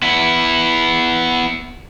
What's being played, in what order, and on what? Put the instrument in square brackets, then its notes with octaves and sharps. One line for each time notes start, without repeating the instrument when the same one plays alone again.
[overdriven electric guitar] B3 E4